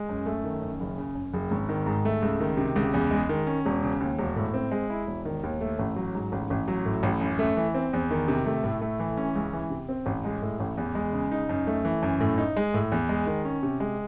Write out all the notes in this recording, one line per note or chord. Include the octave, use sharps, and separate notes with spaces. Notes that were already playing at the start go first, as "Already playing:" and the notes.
Already playing: G#3
F#2
A3
D#3
F#2
F#1
C#3
F#2
F#1
G#1
D#3
G#2
A3
C#2
D#3
C3
C#2
E2
G#3
D#3
C#4
E1
C#3
D#2
E1
A2
C4
G#3
E4
E1
D#3
D#2
A3
A1
F#3
G#2
A1
A1
F#3
A2
A1
F#2
A3
E3
C4
E2
D#3
C3
A3
A2
A3
E3
C#4
C#2
E3
C3
C4
A1
G#3
A2
A1
E2
G#3
C#3
D#4
F#2
A3
E3
F#2
A2
D#4
G#3
A2
E2
G#3
D#3
C#4
C3
G#3